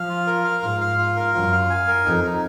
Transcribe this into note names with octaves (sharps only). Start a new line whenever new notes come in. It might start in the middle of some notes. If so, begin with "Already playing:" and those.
Already playing: F3 F5
F4
A#4
F5
G#2 F4
F5
F4
A#4
F#2 F4
F5
G#5
A#4
F2 D#4
D#4